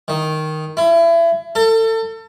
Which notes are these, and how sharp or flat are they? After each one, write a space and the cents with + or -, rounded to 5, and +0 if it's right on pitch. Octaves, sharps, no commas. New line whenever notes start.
D#3 +0
E4 +30
A4 +30